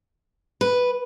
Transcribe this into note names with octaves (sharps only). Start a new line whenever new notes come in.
B4